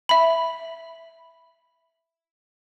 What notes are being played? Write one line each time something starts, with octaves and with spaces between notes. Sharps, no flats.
E5 B5